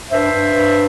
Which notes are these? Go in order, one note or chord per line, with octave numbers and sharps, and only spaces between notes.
G2 C5 E5
G2
G2